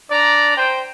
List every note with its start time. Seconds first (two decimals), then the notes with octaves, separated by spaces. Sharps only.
0.10 D4 D5 A#5
0.57 C5 G5